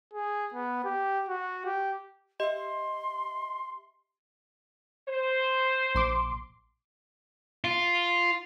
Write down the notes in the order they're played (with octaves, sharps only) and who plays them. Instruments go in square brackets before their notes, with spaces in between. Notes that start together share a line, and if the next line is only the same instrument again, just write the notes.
[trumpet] G#4
B3
G4
F#4
G4
[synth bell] G4 E5 [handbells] D#5 [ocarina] C6
[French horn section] C5
[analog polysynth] A#1 C6 D6
[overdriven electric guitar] F4